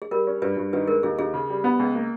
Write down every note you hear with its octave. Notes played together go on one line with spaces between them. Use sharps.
G#4
G3 A#4
C#4
G2 B4
G2
D#3 B4
G#3 A#4
D#2 G#4
D#2 G#4
C#3
G3
B3
C#2
A#3